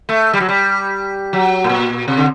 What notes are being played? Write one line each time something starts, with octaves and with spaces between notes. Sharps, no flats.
A3
G3
F#3
G3
F#3
A2
A#2
C3
D3